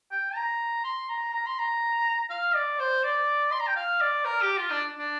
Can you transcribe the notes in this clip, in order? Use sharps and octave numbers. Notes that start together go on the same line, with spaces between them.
G5
A#5
C6
A#5
A#5
C6
A#5
F5
D5
C5
D5
C6
A#5
G5
F5
D5
A#4
G4
F4
D4
D4